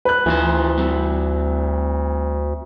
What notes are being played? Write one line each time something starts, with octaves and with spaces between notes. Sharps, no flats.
B4 F#6
D2 A2 E3 F4 C5
G3 C4